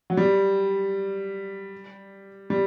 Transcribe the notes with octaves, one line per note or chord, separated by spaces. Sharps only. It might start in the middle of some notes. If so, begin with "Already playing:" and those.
F#3
G3
G3